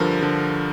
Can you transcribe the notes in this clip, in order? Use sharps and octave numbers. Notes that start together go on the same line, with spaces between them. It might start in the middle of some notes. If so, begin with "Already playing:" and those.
Already playing: G2 D3 F3 A#4
D3 F3